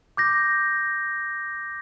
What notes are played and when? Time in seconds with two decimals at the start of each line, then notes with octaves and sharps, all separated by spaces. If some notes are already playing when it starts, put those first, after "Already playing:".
0.17 D6 G6 A#6